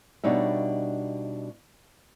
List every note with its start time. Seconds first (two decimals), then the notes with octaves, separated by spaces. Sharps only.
0.24 B2 G3 D4 D#4 C#5 E5